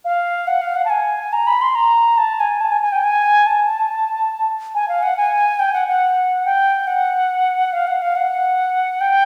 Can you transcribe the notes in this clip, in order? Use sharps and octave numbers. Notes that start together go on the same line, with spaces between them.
F5
F#5
F5
F#5
A5
G#5
A#5
B5
C6
A#5
A5
G#5
A5
G#5
G#5
G5
G#5
A5
G#5
F5
F#5
G#5
G5
F#5
F#5
G5
F#5
F5
F#5
F5
F#5
G5